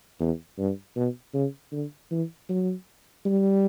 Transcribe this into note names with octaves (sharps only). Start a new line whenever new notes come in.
E2
G2
B2
C#3
D3
E3
F#3
G3